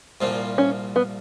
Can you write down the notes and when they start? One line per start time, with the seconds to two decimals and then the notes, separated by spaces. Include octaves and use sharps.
0.21 C2 A#2 F3
0.58 C#4
0.96 B3